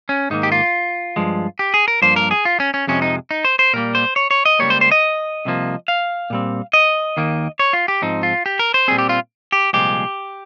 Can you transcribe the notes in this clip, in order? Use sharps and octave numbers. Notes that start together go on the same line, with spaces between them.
C#4
G#2 D#3 A#3 D#4
G4
F4
G2 F3 G#3
G4
G#4
A#4
G2 F3 A#3 C5
A#4
G#4
F4
C#4
C#4
F2 C3 F3 G#3 C#4
D#4
D#4
C5
C5
A#2 G3 A#3 A#4
C5
C#5
C#5
D#5
C#2 C#3 G3 A#3 C#5
C5
C5
D#5
C2 C3 F3 A#3
F5
A#2 G3 C4
D#5
D#2 D#3 A#3
C#5
F4
G4
G#2 F3 C4 D#4
F4
G4
A#4
C5
A#2 G3 C4 G#4
G4
F4
G4
C2 A#2 F3 G#3 G4